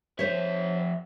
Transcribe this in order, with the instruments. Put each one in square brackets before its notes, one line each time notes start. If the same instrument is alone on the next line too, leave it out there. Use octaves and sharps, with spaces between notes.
[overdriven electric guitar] F2 E5 [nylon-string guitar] C5 C#5